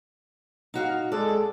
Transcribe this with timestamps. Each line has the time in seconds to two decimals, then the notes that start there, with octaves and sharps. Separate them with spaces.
0.74 D#4 F#4 F5
1.12 G#3 A4 D5